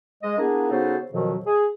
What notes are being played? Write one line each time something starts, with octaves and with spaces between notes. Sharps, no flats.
G#3 D#5
A#3 B3 D4 E4 G#4
C#3 B3 D#4 F#4 A4 C5
F2 B2 D#3 F3 F#3
G#4